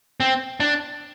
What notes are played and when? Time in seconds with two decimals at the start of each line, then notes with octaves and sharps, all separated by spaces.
0.20 C4
0.60 D4